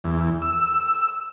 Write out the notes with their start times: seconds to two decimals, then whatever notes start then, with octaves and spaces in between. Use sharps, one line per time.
0.04 E2
0.42 E6